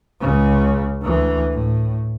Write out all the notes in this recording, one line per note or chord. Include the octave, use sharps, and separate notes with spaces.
C#2 C#3
D2 E3
A2